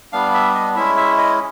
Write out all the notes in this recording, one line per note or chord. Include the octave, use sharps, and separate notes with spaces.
G3 B3 D4 F5
E5
D#5
G#3 C#4 E4 E5
E5
D#5